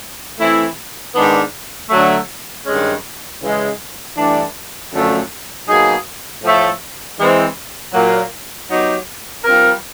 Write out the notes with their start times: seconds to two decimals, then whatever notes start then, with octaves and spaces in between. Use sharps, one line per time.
0.40 E3 A3 C4 E4
1.15 G#2 D#3 G#3 B3 D4
1.90 D3 F#3 A3
2.66 G2 D#3 G#3 C#4
3.42 C#3 E3 G#3
4.17 G2 E3 A3 D4
4.92 F#2 D3 F3 A3
5.68 B2 F#3 A#3 D#4 G#4
6.43 A2 F3 A3
7.19 E3 G#3 C4
7.94 A#2 F#3 A#3
8.70 F#3 B3 D#4 G4
9.44 G3 C4 F4 A#4